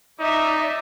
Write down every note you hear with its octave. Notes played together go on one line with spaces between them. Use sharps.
D#4 D5 E5